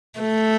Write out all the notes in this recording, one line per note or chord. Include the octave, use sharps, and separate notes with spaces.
A3